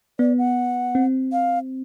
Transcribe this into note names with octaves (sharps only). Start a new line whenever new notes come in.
B3 D5
F#5
C4
F5